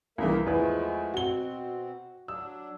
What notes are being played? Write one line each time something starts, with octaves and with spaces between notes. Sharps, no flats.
C2 E3 A#3 A#4 E5
E2 F3 G#3 A3 B4
B2 C4 F#4 G7
F#3 D4 E6